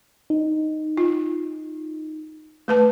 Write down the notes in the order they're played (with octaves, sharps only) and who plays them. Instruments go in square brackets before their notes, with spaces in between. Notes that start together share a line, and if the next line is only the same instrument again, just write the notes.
[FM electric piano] D#4
[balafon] F4
A3 B4 A5